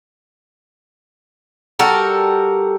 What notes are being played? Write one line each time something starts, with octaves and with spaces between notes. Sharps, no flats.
G3 F#4 A4 A#4